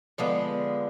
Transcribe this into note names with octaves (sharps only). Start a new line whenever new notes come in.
D3 F3 G#3 B3